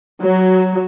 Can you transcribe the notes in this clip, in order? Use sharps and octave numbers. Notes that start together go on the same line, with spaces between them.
F#3